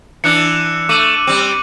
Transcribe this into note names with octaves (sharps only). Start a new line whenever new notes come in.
E3 D4 F#6 C#7
A3 D6 D#7 F#7
G3 C4